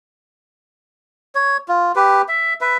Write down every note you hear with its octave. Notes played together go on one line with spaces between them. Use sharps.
C#5
F4
G4 B4
E5
B4 E5